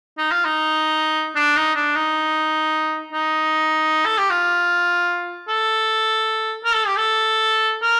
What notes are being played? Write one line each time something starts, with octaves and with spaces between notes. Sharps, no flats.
D#4
F4
D#4
D4
D#4
D4
D#4
D#4
A4
G4
F4
A4
A#4
A4
G4
A4
A#4